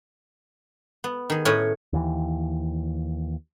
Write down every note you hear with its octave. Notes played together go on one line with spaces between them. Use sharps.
B3
D#3 G#4
A2 C#4 C#5 D#5 G#5 B5
D#2 E3